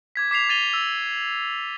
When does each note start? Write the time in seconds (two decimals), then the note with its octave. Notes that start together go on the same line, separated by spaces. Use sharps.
0.16 D6 G#6 B6
0.31 D6 B6 C7 F7
0.49 D6 A6 D#7 F7 G7
0.73 E6